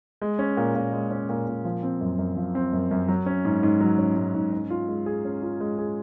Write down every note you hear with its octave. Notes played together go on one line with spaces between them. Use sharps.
G#3
C#4
A#2
A#2
G#3
C#4
A#2
A#2
F3
C4
F#2
F#2
F3
C4
F#2
F#2
F#3
C#4
G#2
G#2
F#3
C#4
G#2
G#2
C#4
F4
G#3
G#4
C#4
F4
G#3
G#4